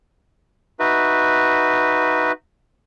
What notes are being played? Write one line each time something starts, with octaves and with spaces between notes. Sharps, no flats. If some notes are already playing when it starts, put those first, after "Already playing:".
D#4 F#4 B4 E5